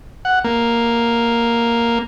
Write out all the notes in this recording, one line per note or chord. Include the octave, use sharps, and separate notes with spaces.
F#5
A#3